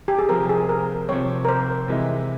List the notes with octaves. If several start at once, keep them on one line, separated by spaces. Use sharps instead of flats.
G4
G#4
C3 F3 C4 A#4
G#4
A#4
C3 F3 C4 C#5
A#4
C5
C3 E3 G#3 E4